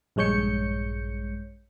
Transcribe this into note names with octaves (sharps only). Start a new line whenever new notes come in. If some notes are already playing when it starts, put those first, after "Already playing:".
A#1 G2 G#3 C#5 G6 C#7